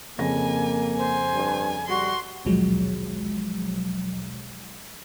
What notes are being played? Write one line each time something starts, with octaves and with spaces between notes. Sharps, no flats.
F2 C#3 A#3 G#5 A#6
C5 G#5
G2
G3 F#4 C6
A#1 D#2 B2 F3 F#3 G#3